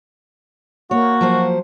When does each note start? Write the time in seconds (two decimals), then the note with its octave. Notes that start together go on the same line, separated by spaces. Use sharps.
0.91 A#3 F#4 C#5
1.21 F3 F#3 C5